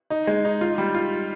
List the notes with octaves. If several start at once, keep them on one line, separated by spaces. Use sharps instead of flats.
D#4
G#3
D#4
F4
G3
F4